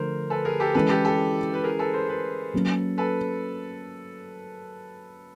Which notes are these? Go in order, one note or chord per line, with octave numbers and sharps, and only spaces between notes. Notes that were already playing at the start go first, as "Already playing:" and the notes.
Already playing: D3 F3 A3 A#4 C5
A4 B4
G#4 A#4
G4 A4
E3 G#3 C#4 E4 A4 B4
G4 A4
G4 A4
B4
G#4 A#4
A4 B4
A#4 C5
A4 B4
F#3 A#3 C#4
A4 B4